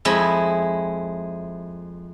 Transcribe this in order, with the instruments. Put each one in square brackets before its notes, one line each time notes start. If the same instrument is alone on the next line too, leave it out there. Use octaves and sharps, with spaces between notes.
[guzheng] F2 G#3 E4 B5